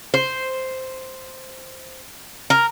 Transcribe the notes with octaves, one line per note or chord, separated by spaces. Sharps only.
C5
A#4